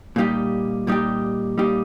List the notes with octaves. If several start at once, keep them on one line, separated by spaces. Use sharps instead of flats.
A#2 G3 D#4 G4
A#2 G3 D#4 G4
A#2 G3 D#4 G4